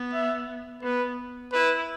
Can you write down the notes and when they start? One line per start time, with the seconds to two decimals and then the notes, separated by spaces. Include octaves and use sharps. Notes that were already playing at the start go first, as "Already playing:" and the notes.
Already playing: B3
0.13 E5
0.83 B3 B4
1.52 E4 B4